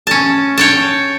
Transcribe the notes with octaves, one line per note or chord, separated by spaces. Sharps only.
C#4 A5
C#5 G5 A5